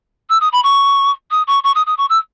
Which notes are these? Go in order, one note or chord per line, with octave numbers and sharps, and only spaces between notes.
E6
D#6
B5
C#6
D#6
C#6
C#6
D#6
D#6
C#6
E6